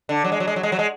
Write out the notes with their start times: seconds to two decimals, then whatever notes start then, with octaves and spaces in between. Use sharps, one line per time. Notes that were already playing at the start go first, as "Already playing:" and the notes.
0.09 D3
0.24 F#3
0.32 G#3
0.40 F#3
0.47 G#3
0.56 F#3
0.63 G#3
0.72 F#3
0.79 G#3